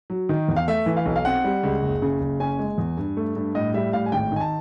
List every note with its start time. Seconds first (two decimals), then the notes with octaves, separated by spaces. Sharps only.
0.10 F#3
0.29 D#3
0.48 E2
0.56 F5
0.68 A3 E5
0.86 E3
0.97 F5
1.05 B1
1.16 F5
1.25 C4 F#5
1.44 G3
1.63 C#2
1.82 F#1
2.02 C#3
2.21 F#1
2.40 C#4 G#5
2.59 G#3
2.78 E2
2.97 G2
3.17 A3
3.36 G2
3.55 A2 D#5
3.74 G3 E5
3.93 A2 F5
4.06 G#5
4.12 G#1 G5
4.32 D#3 G#5
4.41 A5